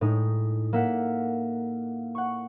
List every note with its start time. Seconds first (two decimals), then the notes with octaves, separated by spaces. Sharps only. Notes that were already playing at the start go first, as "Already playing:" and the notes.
0.01 A2 G#3 D#4
0.73 A#3 E5 F#5
2.15 F#5 C#6